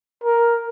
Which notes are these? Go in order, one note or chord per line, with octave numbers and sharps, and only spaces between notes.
A#4